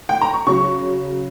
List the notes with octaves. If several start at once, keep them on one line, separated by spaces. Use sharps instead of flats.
G5
A#5
C#6
C#3 F#3 C#6